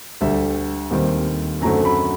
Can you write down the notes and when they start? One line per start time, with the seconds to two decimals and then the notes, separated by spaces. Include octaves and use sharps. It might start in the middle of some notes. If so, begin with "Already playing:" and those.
0.21 D2 D3 G3 E5
0.91 D#2 D#3 G3 C4
1.61 F#2 D3 F#3 A3 C4 A#5
1.85 B5